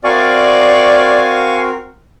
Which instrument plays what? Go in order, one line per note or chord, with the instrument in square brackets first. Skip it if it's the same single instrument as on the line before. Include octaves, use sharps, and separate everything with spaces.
[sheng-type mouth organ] C4 F#4 A#4 [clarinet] D5 [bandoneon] F5 G#5 C#6